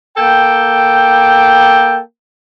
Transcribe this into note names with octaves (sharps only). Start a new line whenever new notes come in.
A#3 A4 G5